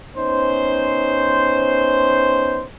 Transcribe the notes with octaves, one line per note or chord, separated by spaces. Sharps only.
B3 C#4 D#4 C5